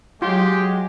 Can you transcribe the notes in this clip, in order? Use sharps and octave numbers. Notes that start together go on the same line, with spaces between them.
F#3 G#3 F4 G4 C6